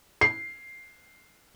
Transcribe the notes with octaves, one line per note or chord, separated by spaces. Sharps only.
C7